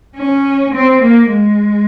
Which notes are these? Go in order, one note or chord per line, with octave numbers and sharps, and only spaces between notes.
C#4
C4
A#3
G#3